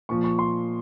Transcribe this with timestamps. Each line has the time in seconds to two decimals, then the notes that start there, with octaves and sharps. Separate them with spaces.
0.09 A#2 F3 C#6
0.24 C#6
0.39 C6